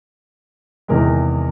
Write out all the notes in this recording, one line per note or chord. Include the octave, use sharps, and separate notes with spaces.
E2 C3 D#3 G#3 A#4